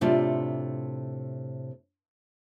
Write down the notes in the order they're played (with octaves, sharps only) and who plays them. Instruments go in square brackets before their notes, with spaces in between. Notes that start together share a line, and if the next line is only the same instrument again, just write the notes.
[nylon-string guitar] A2 C3 A3 D4 F4